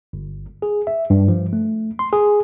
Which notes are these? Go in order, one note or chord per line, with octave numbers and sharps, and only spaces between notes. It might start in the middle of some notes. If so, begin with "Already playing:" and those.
G1
G#4
E5
G2
F3
A3
C6
G#4